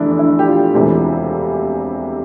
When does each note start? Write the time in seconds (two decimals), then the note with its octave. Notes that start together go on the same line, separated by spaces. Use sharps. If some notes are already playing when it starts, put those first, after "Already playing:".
Already playing: F1 E2 D3 D4 E4
0.11 D4
0.19 E4
0.39 G4
0.47 F4
0.74 E1 D2 C3 E3